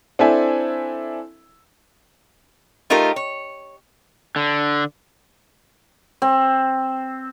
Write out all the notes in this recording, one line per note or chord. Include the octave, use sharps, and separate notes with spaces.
C4 D4 E4 A4 E5 G#5
A3 D#4 F4 G4 A#4
C#5
D3
C4